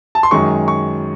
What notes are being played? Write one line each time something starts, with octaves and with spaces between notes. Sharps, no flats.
A5
C6
F#2 D#3 G#3 C#4 C#6
C#6